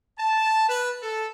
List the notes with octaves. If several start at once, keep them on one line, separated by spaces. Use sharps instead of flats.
A5
B4
A4